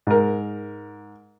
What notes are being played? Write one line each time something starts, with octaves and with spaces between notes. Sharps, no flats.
G#2 A#4